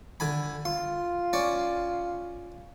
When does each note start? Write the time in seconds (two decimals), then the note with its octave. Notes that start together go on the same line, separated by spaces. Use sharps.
0.20 D3 G#5 B5
0.65 F4 C6
1.33 C#4 D5